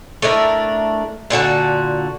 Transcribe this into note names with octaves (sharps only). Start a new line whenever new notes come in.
A3 D4 E4 A#4
A#2 D3 F#4 A5